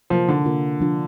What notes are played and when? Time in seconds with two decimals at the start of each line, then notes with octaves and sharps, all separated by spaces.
0.10 C3 F3 A#3 F4 A#4
0.28 D3
0.46 C3 A#3 F4 A#4
0.80 F3 D4 F4